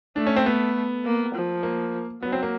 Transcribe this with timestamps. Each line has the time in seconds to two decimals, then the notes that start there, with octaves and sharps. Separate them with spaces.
0.16 A3 D4
0.27 C#4
0.36 C4
0.46 B3
1.05 A#3
1.34 F3
1.63 A#3
2.23 F#3 B3
2.32 C4
2.43 A#3